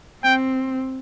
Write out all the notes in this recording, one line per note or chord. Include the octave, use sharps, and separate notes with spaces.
C4 G5